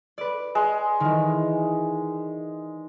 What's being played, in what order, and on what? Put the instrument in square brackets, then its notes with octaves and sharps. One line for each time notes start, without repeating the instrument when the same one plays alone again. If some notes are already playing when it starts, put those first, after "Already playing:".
[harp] B4 D5
[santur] G#3
[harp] D#3 E3